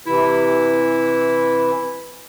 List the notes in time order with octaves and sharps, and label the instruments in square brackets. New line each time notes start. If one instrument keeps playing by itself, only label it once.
[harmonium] C3 E3 [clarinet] E4